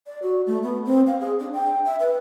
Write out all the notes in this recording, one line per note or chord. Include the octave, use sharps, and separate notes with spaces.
D5
F#4
A3
B3
C4
F5
G#4
D4
G5
E5
B4